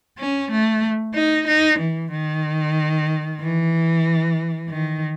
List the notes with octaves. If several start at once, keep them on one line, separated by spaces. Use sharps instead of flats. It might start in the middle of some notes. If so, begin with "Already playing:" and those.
C#4
A3
D#4
D#4
E3
D#3
E3
D#3